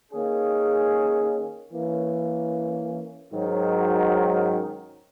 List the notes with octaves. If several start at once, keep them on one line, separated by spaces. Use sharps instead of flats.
D#3 A#3 C#4 G#4
E3 A#3 C#4
G#2 D#3 F#3 C#4